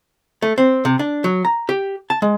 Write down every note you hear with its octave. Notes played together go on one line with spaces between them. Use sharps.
A3
C4
C3
D4
F#3
A#5
G4
A5
G#3